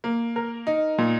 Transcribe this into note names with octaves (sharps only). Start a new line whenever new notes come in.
A#3
A#4
D#4
A#2